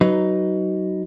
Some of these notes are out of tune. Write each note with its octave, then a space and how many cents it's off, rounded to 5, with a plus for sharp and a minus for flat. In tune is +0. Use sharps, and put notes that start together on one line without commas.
F#3 +20 D#4 +0 B4 +5